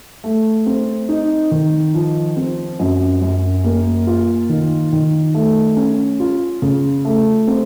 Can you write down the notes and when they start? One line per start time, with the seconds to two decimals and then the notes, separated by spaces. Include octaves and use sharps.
0.24 A3
0.66 C4
1.09 D#4
1.51 D#3
1.94 F3
2.37 C4
2.79 F#2
3.22 F#2
3.64 A#3
4.07 F4
4.49 D#3
4.92 D#3
5.34 A3
5.77 C#4
6.20 F4
6.62 C#3
7.05 A3
7.48 C4